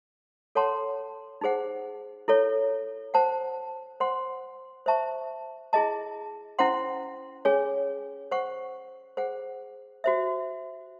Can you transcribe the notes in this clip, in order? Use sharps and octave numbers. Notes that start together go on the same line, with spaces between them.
A4 C#5 F#5 A5 C6
D#4 G#4 C5 F#5
E4 A4 C#5
C5 F#5 A5
C5 F#5 C6
C5 E5 A5 C#6
E4 G#4 D#5 A5
C#4 E4 C5 F#5 C6
C#4 G#4 C#5 G#5
C5 F#5 C#6
G#4 C5 F#5
F#4 C5 E5